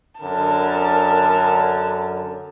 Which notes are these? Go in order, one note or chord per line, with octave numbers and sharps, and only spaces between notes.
F#2 D3 A#4 A5